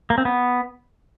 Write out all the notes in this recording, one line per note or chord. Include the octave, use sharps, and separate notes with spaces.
A#3
C4
B3